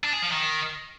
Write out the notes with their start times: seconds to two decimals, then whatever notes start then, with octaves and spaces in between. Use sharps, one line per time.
0.04 D4
0.13 G#4
0.22 F3
0.31 D#3